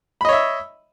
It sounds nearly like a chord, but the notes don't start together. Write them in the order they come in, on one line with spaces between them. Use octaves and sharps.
B5 D#5 C#5 E5